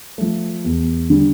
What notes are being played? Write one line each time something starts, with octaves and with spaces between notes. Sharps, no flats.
F3 A3
E2
D3 G3